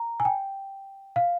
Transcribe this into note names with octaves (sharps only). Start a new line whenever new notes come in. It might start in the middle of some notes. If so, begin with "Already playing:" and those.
Already playing: A#5
G#5
G5
F5